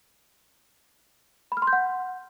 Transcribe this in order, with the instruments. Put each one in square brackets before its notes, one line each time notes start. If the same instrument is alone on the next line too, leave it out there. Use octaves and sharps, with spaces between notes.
[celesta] B5
F6
C6
G6
F#5